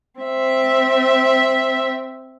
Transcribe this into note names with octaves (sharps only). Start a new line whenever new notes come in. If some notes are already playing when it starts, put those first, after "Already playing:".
C4 E5